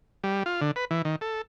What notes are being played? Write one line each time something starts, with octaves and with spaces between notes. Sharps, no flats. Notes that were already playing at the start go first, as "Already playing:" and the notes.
G3
F4
D3
B4
E3
D#3
A4